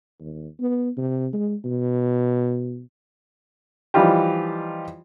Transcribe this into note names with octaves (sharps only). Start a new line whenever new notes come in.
D#2
B3
C3
G#3
B2
E3 F3 G3 D#4 F4 G4